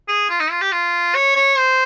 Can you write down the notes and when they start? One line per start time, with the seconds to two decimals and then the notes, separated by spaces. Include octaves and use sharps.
0.08 G#4
0.30 F4
0.40 D#4
0.51 F4
0.61 G4
0.72 F4
1.15 C#5
1.36 C#5
1.57 C5